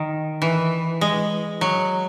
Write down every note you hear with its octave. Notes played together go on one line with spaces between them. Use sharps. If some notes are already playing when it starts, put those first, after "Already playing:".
Already playing: D#3
E3
G#3
F#3